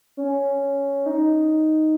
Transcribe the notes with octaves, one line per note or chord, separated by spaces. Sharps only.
C#4
D#4